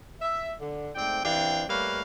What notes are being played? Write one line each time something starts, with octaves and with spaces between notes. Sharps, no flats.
E5
D3
G#2 A3 C4 D5 G5
E3 C4 D4 G4 F5 G5
G3 A3 A#3 B4 C#5 F5